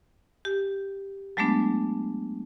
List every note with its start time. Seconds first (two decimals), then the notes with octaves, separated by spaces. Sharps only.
0.45 G4
1.37 F#3 G#3 A3 B3 D4